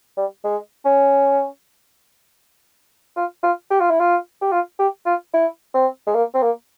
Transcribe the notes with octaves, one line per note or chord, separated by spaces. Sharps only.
G3
G#3
C#4
F4
F4
G4
F4
E4
F4
G4
F4
G4
F4
E4
C4
G#3
A#3
C4
A#3